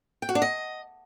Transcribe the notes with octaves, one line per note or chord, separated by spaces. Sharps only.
G5
F#4
D4
D#5